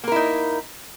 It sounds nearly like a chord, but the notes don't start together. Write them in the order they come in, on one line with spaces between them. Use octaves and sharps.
A#3 A#4 E4 D#4